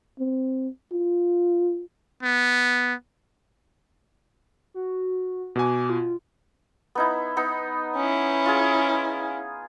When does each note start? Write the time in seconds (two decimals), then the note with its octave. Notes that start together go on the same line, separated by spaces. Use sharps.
0.19 C4
0.92 F4
2.23 B3
4.74 F#4
5.56 B2 F#4 G#5 D6
5.90 F4
6.95 B3 D#4 E4
7.37 B3 D#4
7.96 C#4 E4
8.46 F4 G#4